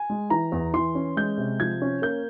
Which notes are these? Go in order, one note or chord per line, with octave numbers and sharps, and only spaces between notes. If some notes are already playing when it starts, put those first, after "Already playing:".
Already playing: G#5
G#3
E3 A#5
E2
E3 C6
C#4
G#3 G6
C3
F3 G#6
C#4
A#3 G6